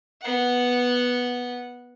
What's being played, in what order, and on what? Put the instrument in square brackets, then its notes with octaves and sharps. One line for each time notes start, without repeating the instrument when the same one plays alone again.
[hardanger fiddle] B3 F#5